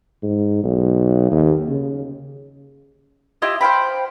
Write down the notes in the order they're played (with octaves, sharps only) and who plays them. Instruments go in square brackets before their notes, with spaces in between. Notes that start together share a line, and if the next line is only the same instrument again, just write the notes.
[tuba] G#2
B1
D#2
C#3
[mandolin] E4 F4 G4 D#5
C5 F5 G5 B5